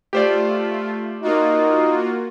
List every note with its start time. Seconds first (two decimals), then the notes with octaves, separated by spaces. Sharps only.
0.13 A3 F4 G4 C5 D5
1.22 A#3 D#4 F4 F#4